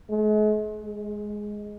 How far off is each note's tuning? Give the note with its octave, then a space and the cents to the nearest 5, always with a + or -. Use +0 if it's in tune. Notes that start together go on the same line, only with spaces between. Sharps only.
G#3 +45
G#3 +5